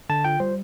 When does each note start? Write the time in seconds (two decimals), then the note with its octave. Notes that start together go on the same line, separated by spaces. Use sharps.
0.10 D3 A5
0.24 F4 G5
0.40 G3 C5